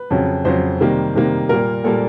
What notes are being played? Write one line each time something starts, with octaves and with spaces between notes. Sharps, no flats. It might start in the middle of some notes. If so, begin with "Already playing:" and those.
Already playing: B4
F2 C#3 F#3
F2 C#3 F#3 C5
C3 D#3 G3 A#3
C3 D#3 G3 A#3
A#2 G3 A#3 A#4
A#2 G3 A#3 A4